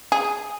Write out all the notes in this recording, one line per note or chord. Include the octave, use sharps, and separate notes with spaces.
G#4